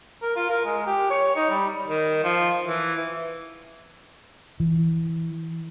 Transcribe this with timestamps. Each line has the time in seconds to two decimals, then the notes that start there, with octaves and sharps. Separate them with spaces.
0.22 A#4
0.36 F4
0.50 A#4
0.65 G#3
0.86 G4
1.10 C#5
1.36 D#4
1.50 G3
1.88 D#3
2.24 F3
2.65 E3
4.60 E3